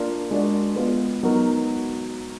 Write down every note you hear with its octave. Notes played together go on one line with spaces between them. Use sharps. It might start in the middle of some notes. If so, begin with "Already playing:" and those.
Already playing: A#3 D4 F4 A#4 D5
G#3 D4 F#4 A#4 D5
G#3 B3 F4 B4
F#3 B3 D#4 F#4 A#4